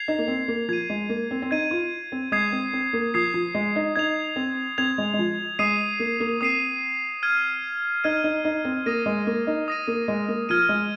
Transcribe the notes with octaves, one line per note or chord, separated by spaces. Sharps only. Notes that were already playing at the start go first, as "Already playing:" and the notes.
Already playing: G#6 C7 F7
D#4
A#3
C4
A#3
F3 G#6 D#7
G#3
A#3
C4
C4
D#4 G#6 D#7
F4
C4
G#3 D#6 G#6 C7
C4
C4
A#3
F3 D#6 G#6 C7
F3
G#3
D#4
D#4 G#6 F7
C4
C4 G#6 F7
G#3
G#3
F3
G#3 D#6 C7 D#7
A#3
A#3
C4 D#6 C7 D#7
F6 G#6 D#7
D#4 F6 G#6 D#7
D#4
D#4
C4
A#3 D#6 A#6 D#7
G#3
A#3
D#4
D#6 A#6 D#7
A#3
G#3
A#3
F3 F6 G#6 D#7
G#3